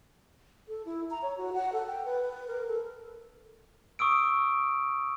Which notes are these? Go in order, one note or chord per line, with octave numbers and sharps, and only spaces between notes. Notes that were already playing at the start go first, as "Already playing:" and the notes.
A4
E4
A#5
C#5
F#4
F#5
A4
G5
B4
B4
A#4
A4
C#6 D#6 E6 D7